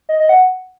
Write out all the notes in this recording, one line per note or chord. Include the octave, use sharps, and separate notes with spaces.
D#5
D#5
F#5